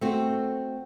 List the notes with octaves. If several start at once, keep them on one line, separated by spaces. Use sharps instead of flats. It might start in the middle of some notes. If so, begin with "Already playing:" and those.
A3 C4 F#4